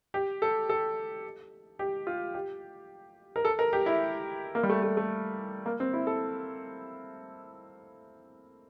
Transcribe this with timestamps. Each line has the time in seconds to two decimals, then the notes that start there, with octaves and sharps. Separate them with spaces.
0.14 G4
0.42 A4
0.69 A4
1.79 G4
2.07 F4
2.34 G4
3.36 A#4
3.45 A4
3.59 A#4
3.73 G4
3.86 E4
4.55 A#3
4.63 G3
4.70 A3
4.83 A3
4.97 A3
5.66 A#3
5.80 C4
5.93 E4
6.07 A4